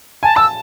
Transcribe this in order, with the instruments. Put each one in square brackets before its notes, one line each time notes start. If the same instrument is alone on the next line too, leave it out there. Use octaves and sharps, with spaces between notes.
[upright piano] G#5 [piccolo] A5
[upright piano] A5 [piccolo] E6